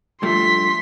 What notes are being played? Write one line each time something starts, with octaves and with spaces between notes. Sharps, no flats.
G2 F3 A3 C6 B6